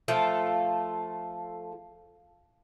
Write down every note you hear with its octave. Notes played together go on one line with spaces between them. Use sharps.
F3 A3 F4 A4